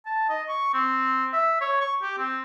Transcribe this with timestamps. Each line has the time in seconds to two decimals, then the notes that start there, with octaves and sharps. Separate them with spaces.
0.06 A5
0.29 D#5
0.49 C#6
0.74 C4
1.33 E5
1.61 C#5
1.81 C#6
2.03 G4
2.18 C4